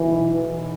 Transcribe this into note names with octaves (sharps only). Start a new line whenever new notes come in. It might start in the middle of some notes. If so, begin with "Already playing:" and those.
Already playing: B1 B2 E3
B1
E3